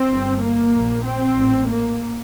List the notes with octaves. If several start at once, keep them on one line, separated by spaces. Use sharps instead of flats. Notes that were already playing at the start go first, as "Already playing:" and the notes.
Already playing: C4
G1 G2
A#3
A#1 A#2
C4
A1 A2
A#3